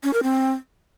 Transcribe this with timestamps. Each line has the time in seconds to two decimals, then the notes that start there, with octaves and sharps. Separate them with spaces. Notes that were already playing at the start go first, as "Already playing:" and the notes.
0.04 C#4
0.13 A#4
0.23 C4